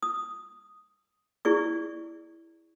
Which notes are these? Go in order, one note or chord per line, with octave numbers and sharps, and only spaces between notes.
D#6
E4 G#4 D5 C#6